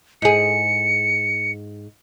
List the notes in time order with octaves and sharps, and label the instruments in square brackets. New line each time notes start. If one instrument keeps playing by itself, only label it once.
[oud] G#2 G#4 [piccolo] C#7